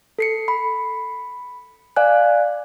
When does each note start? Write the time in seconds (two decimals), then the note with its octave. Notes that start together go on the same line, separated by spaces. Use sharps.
0.19 A4 C7 C#7
0.48 B5
1.96 D5 F5 G#5 F#6